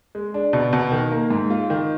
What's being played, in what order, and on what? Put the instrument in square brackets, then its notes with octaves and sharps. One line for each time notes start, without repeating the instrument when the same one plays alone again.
[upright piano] G#3
D4
B2
B2
D#3
A#3
G#2
F4
D#3